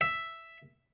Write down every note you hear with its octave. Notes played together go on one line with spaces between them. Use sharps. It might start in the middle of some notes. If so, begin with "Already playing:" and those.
E5